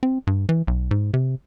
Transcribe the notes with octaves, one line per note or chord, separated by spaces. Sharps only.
C4
G2
E3
B1
G#2
C3